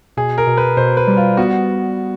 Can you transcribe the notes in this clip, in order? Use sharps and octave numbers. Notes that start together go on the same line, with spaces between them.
B2 G#4
A#4
B2
B4
B2 C5
B4
G3
F4
B3 F#4